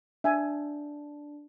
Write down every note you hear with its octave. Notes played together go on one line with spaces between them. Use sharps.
D4 E5 G#5